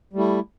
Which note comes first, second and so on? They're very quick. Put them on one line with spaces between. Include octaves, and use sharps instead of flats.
G3 A3 E4